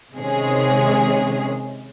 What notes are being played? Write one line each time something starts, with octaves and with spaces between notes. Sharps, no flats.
C3 D#3 G#3 C#4 G#4